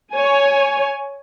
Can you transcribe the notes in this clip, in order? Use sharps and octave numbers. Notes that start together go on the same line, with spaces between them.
C#5 G#5